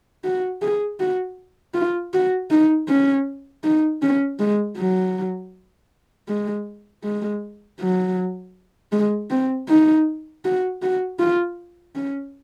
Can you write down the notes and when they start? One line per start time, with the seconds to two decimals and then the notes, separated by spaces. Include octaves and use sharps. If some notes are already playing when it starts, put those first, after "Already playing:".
0.24 F#4
0.61 G#4
1.00 F#4
1.74 F4
2.13 F#4
2.50 D#4
2.88 C#4
3.64 D#4
4.02 C#4
4.39 G#3
4.77 F#3
6.28 G#3
7.04 G#3
7.80 F#3
8.92 G#3
9.30 C4
9.68 D#4
10.44 F#4
10.82 F#4
11.19 F4
11.95 C#4